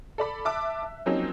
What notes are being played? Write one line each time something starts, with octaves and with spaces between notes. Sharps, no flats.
A4 D5 B5
E5 A5 D6 E6 F#6
E5
F3 F#3 A#3 C4 C#4 D#4